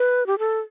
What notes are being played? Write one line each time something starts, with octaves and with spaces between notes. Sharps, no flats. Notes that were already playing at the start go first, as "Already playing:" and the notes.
Already playing: B4
G4
A4